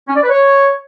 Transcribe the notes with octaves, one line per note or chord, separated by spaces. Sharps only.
C#4
D5
B4
C#5